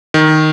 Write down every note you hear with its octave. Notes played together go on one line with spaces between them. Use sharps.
D#3